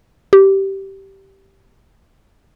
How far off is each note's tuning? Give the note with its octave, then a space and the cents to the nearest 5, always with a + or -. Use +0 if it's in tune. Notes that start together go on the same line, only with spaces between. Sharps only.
G4 -15